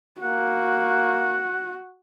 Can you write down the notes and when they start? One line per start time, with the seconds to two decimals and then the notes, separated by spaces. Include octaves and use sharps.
0.22 A#3 F#4 F#5